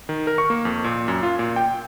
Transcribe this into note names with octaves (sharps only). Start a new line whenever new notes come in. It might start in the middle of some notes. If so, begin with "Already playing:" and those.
D#3
A#4
C#6
A#3
F2
A#2
F#2
F4
A#2
G5